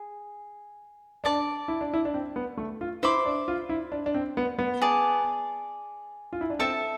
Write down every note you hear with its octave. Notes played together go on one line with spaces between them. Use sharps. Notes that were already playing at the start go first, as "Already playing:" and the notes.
Already playing: G#4
D4 D5 A5 D6
E4
D4
E4
D4
C4
B3
A3
F4
E4 C5 E5 B5 D6
D4
F4
E4
D4
D4
C4
B3
B3
G#4 D5 A5
F4
E4
D4
C4 A4 E5 A5